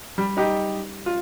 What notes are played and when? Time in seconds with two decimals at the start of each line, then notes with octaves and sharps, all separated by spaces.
0.18 G3
0.37 D#4 G4
1.06 F4